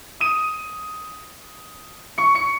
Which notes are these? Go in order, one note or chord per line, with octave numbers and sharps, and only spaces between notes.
D#6 D#7
C#6 C#7
C#6 C#7